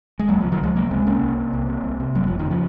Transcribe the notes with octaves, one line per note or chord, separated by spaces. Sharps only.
G#3
C#2 F#3 A#3
C3 F3
D#3 F#3
C#2 F3 G#3
C3 F#3 A#3
C#2 G#3 C4
C3 A#3 C#4
C2
C3
C2
C3
C2
C3
F#1 F#3 A#3
F2 F3
D#3
C#3 F3